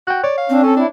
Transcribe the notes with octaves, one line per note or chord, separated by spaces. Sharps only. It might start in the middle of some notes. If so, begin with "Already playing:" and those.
F#4 G5 F#6
C#5 D5
F5
C4 D4
C#4 A4
D4 E4